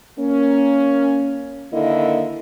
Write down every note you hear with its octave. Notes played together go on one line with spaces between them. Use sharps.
A#3 C#4
D3 D#3 A#3 E4 D#5